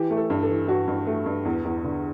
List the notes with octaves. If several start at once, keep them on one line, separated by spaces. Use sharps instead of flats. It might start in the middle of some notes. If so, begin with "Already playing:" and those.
Already playing: E3 G4
A3
A4
G2
A4
E3
G2 F#4
G2
A3
G2
E2
E2
D3